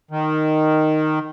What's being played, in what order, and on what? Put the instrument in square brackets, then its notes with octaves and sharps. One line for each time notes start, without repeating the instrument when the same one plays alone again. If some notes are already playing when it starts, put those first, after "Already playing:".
[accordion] D#3